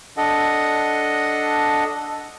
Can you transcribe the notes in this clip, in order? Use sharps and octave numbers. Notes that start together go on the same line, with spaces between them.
D4 A4 D#5 F#5